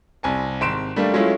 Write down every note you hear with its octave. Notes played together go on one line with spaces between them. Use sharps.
C2 G#5 A5
G#1 C6 D7 E7
G3 A3 A#3 D4
F#3 G#3 A3 C#4 E4 F4